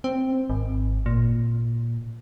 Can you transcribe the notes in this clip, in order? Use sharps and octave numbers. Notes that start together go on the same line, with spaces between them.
C4
G#1
A#2